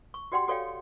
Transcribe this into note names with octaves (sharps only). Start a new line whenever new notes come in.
C#6
F#4 G4 D5 F#5 G5 C6
F#4 A4 C#5 D5 F5 G5